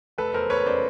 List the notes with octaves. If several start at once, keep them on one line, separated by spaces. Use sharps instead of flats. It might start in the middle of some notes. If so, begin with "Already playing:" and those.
F1 A4 B4
E2 A#4 C5
E2 B4 C#5
C#3 C5 D5